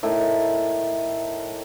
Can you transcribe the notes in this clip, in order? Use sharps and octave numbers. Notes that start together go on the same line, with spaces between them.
A2 D#3